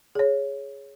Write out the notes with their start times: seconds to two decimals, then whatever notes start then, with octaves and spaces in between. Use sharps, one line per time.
0.15 G#4 C#5